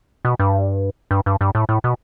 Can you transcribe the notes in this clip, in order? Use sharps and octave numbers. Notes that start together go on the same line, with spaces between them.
B2
G2
G2
G2
G2
A2
A2
B2